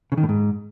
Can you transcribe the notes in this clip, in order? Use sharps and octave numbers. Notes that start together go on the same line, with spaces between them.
C#3
D#3
A2
G#2